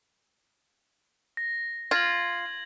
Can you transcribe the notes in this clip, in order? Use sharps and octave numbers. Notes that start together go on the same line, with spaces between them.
A#6
F4 G#6 A#6 F#7